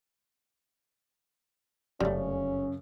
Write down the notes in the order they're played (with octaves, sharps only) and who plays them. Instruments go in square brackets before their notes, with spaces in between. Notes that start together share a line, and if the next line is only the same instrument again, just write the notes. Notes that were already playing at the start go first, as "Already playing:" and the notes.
[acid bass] F1 [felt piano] F#2 C#3 [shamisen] G3 A3 [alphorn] C#4